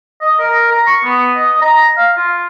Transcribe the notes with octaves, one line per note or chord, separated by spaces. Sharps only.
D#5
A#4
A#5
C#6
B3
D#5
A#5
F5
F4